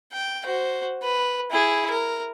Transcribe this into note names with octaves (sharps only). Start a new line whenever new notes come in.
G5
F#4 C5
B4
E4 G#4
A#4